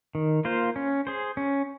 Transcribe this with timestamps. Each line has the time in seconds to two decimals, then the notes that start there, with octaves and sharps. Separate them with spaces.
0.15 D#3
0.45 A#3 F4 C5
0.76 C#4
1.07 G#4 C5
1.37 C#4